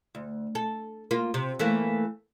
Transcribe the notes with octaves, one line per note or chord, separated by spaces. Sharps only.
D2
A4
A#3 F4
C3
E3 A3 A#3